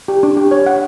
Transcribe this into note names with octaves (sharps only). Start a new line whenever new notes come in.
G4
D4
G4
C#5
F#5